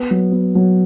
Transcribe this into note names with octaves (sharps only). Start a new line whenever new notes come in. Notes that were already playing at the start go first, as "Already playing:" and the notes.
Already playing: B3
F#3
B3
F#3